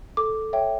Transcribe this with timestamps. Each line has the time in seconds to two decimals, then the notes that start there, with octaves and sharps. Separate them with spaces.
0.17 A4 D6
0.53 C#5 E5 G5